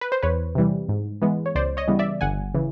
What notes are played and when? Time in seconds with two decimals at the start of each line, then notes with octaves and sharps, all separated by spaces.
0.01 B4
0.12 C5
0.23 E2 B4 C#5
0.55 C3 E3 G3
0.89 G#2
1.22 E3 G#3 B3
1.46 C#5
1.55 C#2 C5 D5
1.77 C#5 D#5
1.88 C#3 E3 G3 B3
1.99 D5 E5
2.21 G1 F#5 G#5
2.54 C#3 E3